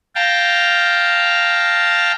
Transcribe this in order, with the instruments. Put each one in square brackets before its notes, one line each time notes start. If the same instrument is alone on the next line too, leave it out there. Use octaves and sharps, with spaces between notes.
[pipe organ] F5 G5 A5 A#5